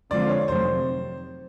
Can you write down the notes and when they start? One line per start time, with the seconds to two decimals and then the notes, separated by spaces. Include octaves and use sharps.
0.11 D3 F3 G#3 C4 F4 D5
0.29 C#5
0.48 F2 C3 D#3 F#3 A3 C5